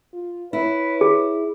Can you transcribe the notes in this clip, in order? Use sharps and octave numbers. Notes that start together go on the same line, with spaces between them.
F4
E4 B4 C#5
G#4